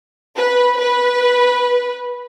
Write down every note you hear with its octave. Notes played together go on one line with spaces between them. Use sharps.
B4
B4